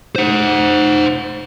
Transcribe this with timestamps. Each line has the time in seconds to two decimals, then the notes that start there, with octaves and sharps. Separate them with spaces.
0.16 C5 F#5